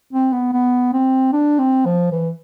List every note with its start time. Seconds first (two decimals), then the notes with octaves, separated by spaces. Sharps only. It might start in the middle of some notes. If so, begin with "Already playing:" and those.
0.13 C4
0.33 B3
0.53 B3
0.93 C4
1.32 D4
1.59 C4
1.86 F3
2.12 E3